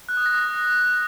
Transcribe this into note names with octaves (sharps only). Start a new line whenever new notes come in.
F#6
D#6
A#6
D#6